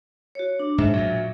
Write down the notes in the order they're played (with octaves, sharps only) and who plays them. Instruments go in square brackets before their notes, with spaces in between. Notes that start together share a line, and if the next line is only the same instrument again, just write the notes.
[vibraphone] F#4 C#5
D4
[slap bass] G#2 [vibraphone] E5
[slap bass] A#2 F#3